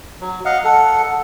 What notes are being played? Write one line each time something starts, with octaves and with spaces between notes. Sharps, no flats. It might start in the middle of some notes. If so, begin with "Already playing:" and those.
F#3
D#5 F5 F#5
A4 F#5